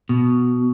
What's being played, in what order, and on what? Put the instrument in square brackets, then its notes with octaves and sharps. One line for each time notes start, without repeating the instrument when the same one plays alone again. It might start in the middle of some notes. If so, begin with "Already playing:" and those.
[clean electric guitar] B2